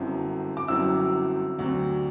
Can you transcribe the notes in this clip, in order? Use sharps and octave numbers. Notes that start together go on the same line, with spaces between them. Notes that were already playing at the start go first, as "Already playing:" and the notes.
Already playing: G1 F#2 F#3 C4 E4
D6
G1 F#2 F#3 C4 E4 E6
D2 C3 F#3 C4